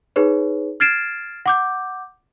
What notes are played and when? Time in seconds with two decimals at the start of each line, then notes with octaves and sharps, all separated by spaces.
0.16 D#4 G#4 B4 C#5
0.80 F6 G#6 A6 C7 D7 E7
1.46 F#5 D6 G6